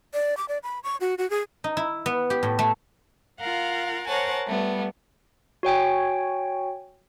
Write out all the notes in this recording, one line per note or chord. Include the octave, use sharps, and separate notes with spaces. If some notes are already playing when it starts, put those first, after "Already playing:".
D5
D6
D5
B5
C#6
F#4
F#4
G#4
D#4
E4
B3
G4
A2
A3
F4 A#4 F5 F#5
A#4 C5 C#5 F#5 G#5 A5
G3 A3 B3
F#4 C#5 G5 G#5